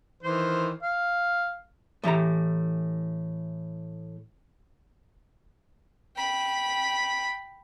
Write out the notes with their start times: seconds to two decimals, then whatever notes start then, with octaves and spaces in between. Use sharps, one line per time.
0.23 D#3 E3 C5
0.83 F5
2.04 A2 E3 G4 A#5
6.16 G5 B5